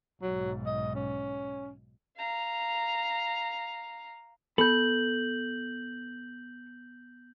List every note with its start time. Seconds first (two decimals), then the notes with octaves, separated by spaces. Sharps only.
0.22 B1 G#2 F#3
0.67 D#5
0.95 C#4
2.18 F5 A#5
4.58 B3 A4 B5 G6 F#7